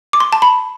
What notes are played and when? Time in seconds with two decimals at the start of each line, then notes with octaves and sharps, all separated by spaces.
0.13 D6
0.20 C6
0.33 A5
0.42 B5